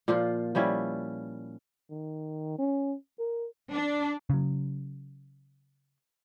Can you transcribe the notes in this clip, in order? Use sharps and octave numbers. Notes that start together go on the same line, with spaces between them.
A#2 F3 F4
F3 G3 C#4 E4
D#3
C#4
A#4
D4
C#3 F#3